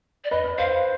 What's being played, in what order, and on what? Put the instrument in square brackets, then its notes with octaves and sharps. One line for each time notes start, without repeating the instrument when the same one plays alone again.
[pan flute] D5
[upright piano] B4 [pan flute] D#5
[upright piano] C5 [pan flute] F5